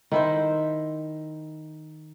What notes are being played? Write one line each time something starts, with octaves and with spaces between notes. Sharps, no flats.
D#3 E4 C5